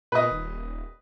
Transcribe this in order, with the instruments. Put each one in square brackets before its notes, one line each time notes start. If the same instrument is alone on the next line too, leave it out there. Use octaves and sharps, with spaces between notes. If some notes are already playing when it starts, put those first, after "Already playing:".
[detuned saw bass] A#2 [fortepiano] B4 D#5
[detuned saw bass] D#1